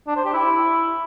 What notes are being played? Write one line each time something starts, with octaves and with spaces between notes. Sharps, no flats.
D4
C5
G4
E4